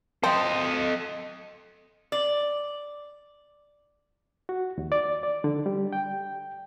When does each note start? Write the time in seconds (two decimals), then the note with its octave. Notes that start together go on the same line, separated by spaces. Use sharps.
0.23 C4 A4 D#5
2.12 D5
4.49 F#4
4.78 D#2
4.92 D5
5.23 D5
5.44 D3
5.66 G3
5.93 G5